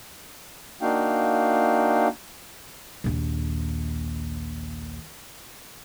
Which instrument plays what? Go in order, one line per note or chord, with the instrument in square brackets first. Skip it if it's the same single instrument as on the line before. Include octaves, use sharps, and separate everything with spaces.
[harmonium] A#3 D4 D#4 F#4 F5 G5
[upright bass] A#1 D#2